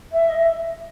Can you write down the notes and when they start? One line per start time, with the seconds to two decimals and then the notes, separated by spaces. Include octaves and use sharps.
0.12 E5
0.29 D#5
0.38 E5